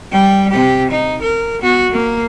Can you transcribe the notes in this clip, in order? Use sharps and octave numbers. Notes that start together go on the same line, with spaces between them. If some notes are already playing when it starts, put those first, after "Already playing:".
G3 G5
C3 G4
D#4
A#4
B3 F#4
A#3